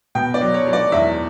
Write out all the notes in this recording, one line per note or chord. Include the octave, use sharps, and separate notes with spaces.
B2 G5
D5
F#3
C#5
F#3
D5
E2 E5